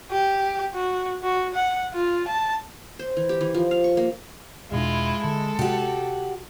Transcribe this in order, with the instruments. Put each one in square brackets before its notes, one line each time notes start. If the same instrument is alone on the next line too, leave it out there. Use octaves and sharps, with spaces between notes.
[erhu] G4
F#4
F#4
F#5
F4
A5
[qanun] C5
E3
G4
E3
F3
F5
C#6
A#3
[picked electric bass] E1 B2 D4 [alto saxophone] G#3 [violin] E4 F4
[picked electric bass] D3 [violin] A4
[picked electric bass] C3 [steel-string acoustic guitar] F#4 G4